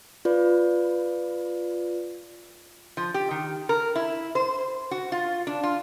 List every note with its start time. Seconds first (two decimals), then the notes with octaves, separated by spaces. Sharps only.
0.25 F4 B4 D5
2.97 F3
3.14 G4
3.31 D#3
3.69 A#4
3.96 E4
4.35 C5
4.91 F#4
5.12 F4
5.47 D4
5.63 F4